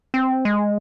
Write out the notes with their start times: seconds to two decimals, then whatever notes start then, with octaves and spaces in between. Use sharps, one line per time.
0.14 C4
0.45 G#3